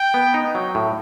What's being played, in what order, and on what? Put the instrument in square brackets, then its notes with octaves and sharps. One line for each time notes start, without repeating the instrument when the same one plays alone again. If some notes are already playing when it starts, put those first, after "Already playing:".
Already playing: [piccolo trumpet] G5
[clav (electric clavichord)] B3
D#4
F#3
A2